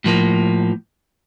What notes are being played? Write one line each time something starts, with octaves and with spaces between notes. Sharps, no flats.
A2 F3 A#3